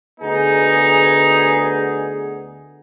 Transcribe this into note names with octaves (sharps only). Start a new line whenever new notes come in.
D2 B3 D#4 G#4